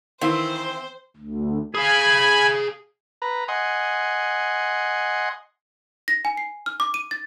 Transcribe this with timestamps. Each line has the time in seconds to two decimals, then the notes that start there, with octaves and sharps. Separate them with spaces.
0.22 D#3 E3 C4 C5 E5 F5
1.17 D2
1.75 G#4 F5 G#5 B5
3.22 B4 A#5
3.48 D#5 F#5 G#5 C6
6.08 A#6
6.25 G#5
6.37 C7
6.66 F6
6.80 D6
6.94 D#7
7.11 A6